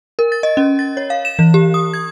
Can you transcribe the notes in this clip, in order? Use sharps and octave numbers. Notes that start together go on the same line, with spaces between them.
A#4
A6
D#5
C#4
A6
C#5
F5
E7
E3
G4
D#6
G#6